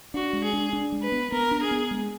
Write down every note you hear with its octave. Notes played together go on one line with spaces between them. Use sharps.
D4 F#4
G#3
G#4
D4
D4
G#3
B4
B3
B3 A#4
D4
G#4
B3
G#3